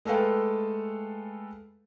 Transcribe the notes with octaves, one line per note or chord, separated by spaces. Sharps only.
G#3 A3 A4 B4 F5 G5